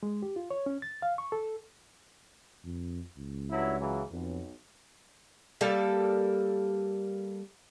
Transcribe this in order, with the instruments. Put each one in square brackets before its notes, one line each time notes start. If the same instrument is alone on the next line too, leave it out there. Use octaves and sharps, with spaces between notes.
[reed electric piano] G#3
G4
F4
C#5
C#4
A6
F5
C#6
A4
[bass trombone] F2
C#2
[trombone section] G2 F#3 E4
C#3 E3 F#3
[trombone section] B1 [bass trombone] F2
[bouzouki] G3 A#3 A4